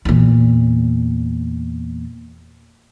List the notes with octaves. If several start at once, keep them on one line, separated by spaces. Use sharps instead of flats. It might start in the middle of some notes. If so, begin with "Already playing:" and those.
E2 A#2